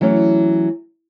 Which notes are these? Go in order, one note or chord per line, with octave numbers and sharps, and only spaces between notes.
E3 F#3 A3 C#4